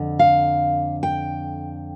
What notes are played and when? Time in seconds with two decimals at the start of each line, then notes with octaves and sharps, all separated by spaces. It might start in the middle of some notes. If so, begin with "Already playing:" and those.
Already playing: F2 D3
0.19 F5
1.03 G5